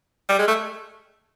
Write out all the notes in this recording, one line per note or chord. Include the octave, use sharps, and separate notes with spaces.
G3
G#3
A3